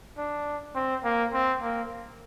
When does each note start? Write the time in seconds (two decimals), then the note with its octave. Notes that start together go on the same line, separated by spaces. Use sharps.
0.18 D4
0.75 C4
1.04 A#3
1.33 C4
1.62 A#3